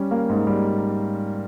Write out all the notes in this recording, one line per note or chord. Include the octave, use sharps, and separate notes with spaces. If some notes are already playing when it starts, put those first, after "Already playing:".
Already playing: G3 C#4
A#3
G#2
G3